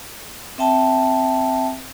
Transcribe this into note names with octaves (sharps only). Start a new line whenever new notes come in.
C4 E5 G5 A5